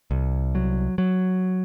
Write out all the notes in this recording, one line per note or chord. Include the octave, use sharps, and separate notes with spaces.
C2
F#3
F#3